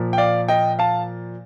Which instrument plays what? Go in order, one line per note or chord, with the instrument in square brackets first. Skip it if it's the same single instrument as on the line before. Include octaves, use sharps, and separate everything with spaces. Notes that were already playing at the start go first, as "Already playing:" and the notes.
Already playing: [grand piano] A#2 F3
G5
D5 F5
D#5 G5
F5 A5